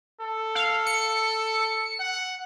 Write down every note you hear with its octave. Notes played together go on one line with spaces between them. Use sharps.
A4
F5
C#7
F#5